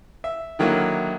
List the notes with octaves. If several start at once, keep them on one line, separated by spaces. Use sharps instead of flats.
E5
D3 D#3 F#3 A#3 E4